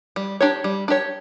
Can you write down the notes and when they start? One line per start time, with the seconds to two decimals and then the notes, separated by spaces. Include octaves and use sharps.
0.16 G3
0.41 D4 G4 C#5
0.64 G3
0.88 D4 G4 C#5